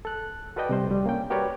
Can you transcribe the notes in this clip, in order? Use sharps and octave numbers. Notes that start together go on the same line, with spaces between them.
A4 F#6
F#4 A4 B4 D5 D#5 G5
C3 G3 C5
C2 G3
A#3 C#4 G5
F#4 G4 A#4 B4 C#5 D5